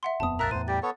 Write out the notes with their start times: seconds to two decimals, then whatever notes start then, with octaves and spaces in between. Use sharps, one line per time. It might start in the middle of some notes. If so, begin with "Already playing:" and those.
0.03 E5 F#5 C6
0.20 D#1 F2 B3 A5 D#6
0.39 B1 F2 A#2 A#4 E5 A#5 F#6 A6
0.51 E2 A2 C5 D#7
0.68 G3 G4 A6
0.83 B3 A4 C#5